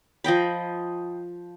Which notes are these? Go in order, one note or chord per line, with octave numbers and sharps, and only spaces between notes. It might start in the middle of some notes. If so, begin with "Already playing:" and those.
F3 D#5 G5 B5